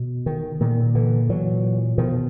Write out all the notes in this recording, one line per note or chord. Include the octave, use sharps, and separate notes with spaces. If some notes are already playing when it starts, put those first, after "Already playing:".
Already playing: B2
D#3
A#2 D#3
D3 E3
A#2 E3 F#3
B2 D#3 F3